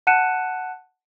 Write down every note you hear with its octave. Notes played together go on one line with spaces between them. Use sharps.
F#5 A5 F#6 C#7 D#7 E7